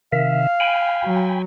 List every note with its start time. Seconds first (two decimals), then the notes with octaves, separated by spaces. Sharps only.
0.12 C3 D#3 E5 F5
0.60 G5 G#5 B5
1.04 F#3